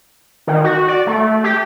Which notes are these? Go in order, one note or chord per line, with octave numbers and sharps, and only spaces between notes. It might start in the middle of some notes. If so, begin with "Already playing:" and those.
D#3
F#4
D5
A3
G4